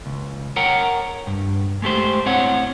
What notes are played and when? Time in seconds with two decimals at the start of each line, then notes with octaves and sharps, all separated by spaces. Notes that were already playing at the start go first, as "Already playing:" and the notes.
0.06 C#2
0.56 A#4 C#5 F#5 G5 A#5
1.27 G2
1.82 G#3 A3 G4 C5
2.26 A2 C4 C#5 F#5